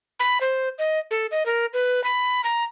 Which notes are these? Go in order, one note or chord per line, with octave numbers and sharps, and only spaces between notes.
B5
C5
D#5
A4
D#5
A#4
B4
B5
A#5